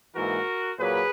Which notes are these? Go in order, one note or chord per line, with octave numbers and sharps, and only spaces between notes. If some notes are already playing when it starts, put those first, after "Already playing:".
G#2 E3 A#3 F#4 A#4
A#2 F#3 A#3 G#4 B4